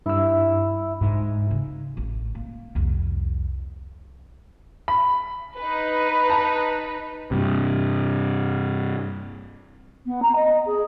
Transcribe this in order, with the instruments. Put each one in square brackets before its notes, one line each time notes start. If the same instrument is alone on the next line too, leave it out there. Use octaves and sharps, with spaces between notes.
[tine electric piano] G2 E6 [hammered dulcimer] E4
[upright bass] G#2
C#3
A1
A#3
C2 F2
[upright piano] B5
[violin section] D#4 B4
[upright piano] A5 A#5
[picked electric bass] G2 C3
[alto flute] B3
A#5
D#5
G#4